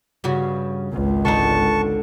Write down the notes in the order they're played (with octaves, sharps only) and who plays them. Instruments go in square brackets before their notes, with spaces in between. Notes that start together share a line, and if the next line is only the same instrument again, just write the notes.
[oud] G2 C#3 F#4
[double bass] G#1 C#2
[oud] D3 D4 D#4 [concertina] A5 C#6